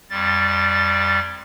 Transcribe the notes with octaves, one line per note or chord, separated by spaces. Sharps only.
F2 G3 A6